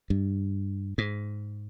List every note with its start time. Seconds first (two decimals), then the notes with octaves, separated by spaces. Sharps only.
0.10 G2
0.98 G#2